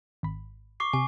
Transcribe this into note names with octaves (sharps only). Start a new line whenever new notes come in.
G#1 B5
C#6 D6 C7
C3 G#5